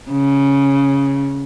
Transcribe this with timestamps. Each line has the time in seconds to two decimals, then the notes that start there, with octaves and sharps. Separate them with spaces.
0.11 C#3